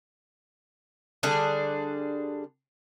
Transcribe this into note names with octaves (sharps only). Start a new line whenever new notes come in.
D3 G3 D4 G#4